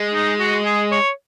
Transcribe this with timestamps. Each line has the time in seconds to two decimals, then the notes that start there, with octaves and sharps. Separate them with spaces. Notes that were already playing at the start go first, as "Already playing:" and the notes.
Already playing: G#3
0.14 D#4
0.39 F#4
0.65 G#4
0.91 C#5